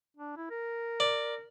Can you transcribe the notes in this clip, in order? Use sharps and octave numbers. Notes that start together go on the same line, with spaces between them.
D4
E4
A#4
D5